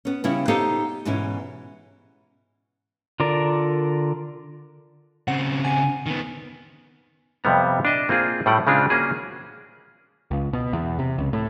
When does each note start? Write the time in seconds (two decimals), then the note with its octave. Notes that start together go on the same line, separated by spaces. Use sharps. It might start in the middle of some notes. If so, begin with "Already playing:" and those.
0.05 B3 C#4
0.24 C#3 G3 B3 C#4 E4
0.48 B3 D#4 G4 A4 C5 F5
1.05 G#2 B2 E3 C#4 E4
3.20 D3 F4 A#4 D5
5.28 C#3 C4 F#5
5.64 G#5
6.06 D#3 B3
7.44 F2 C3 G3 B3 A#5
7.85 D4 D#5 E5
8.09 A#3 C4 F4 G#4
8.46 A2 G3 A3 F#5 G5
8.67 C#3 G#3 C4 D4 F4
8.90 A#3 C#4 F#4 G#4
10.31 C#2
10.53 B2
10.73 E2
10.99 C3
11.18 C#2
11.33 A2